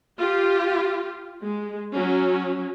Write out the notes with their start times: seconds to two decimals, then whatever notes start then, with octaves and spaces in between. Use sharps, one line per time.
0.19 F4 G4
1.45 G#3
1.93 F#3 C#4